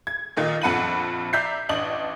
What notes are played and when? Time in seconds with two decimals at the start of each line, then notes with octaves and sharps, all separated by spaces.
0.07 G#6
0.37 A#2 D#3 D#4 F4
0.62 A#1 F2 F#5 B5 D#7 F#7
1.33 D5 E5 A#5 G6 B6 C7
1.69 A1 D4 D#5 F#7